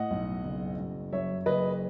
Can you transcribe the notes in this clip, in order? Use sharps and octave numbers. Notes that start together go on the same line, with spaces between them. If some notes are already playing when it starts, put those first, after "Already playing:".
Already playing: A2 D#5 F#5
B1
F#1
F#2
F#2 C#5 E5
F#1 B4 D#5